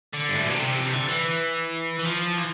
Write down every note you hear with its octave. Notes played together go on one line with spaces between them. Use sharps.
D3
G2
A2
B2
C3
G3
F3
E3
D3
E3
E3
F3
E3